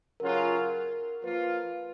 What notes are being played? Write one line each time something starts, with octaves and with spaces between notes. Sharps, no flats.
C#3 F#3 C#4 F4 A#4
F3 A#3 F4 B4